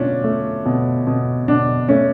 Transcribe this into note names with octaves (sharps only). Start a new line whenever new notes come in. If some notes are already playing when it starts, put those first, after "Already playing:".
Already playing: B2 A3 C#4 D4 F4
A3
B2
B2
B2 D4
A3 C#4